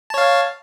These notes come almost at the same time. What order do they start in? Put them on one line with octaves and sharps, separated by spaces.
A5 C#5 F5